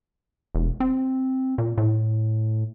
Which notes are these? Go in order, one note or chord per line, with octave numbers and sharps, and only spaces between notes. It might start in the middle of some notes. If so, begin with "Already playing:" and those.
E1
C4
A#2
A2